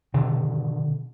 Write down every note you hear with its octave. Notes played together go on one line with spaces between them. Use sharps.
B2 D3 D#3